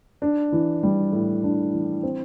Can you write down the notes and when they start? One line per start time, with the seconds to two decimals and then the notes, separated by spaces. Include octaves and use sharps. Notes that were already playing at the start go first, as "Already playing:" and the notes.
0.22 D4
0.52 E3
0.83 G3
1.12 A2
1.43 D4
1.73 E3
2.03 C4